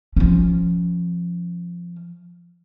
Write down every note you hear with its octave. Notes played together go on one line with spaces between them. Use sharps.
F3 C#4